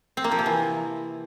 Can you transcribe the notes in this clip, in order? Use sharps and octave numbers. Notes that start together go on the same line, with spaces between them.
C4
A#3
F3
C3
E3